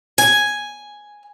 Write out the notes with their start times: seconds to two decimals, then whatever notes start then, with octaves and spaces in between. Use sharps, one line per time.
0.18 G#5